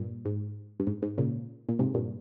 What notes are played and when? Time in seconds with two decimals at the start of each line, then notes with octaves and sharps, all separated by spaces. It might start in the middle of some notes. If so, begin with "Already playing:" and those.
Already playing: G2 A#2
0.25 G#2
0.80 G2
0.87 G#2
1.02 G#2
1.18 A#2 C#3
1.69 A#2
1.79 G#2 C3
1.94 G2 A#2